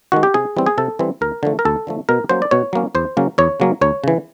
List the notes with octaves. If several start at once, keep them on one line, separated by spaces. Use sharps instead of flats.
D#3 G#3 F#4
G4
C3 G#4
E3 G3 C4
G#4
C3 A4
E3 G3 C4
D2 A#4
D3 F3 A3
A#4
D2 A4
D3 F3 A3
B2 A#4
F#3 A#3 C#4 C5
D5
B2 C#5
F#3 A#3 C#4
E2 C5
C#3 F#3 A#3 C#4
E2 C#5
C#3 F#3 A#3 C#4
D2 C#5
C#3 E3